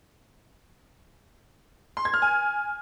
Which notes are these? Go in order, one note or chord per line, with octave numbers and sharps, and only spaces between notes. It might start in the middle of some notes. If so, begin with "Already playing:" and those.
C6
G#6
F6
G#5